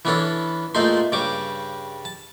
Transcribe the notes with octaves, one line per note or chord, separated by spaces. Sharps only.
E3 B3 C#4 D4 A4 C#5
A#2 G#3 A3 D#4 C5 C6
G2 C#3 G3 C#6 D6
A5